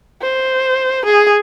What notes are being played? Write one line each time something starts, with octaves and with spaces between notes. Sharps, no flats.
C5
G#4